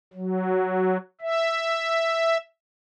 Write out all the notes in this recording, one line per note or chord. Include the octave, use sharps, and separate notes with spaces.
F#3
E5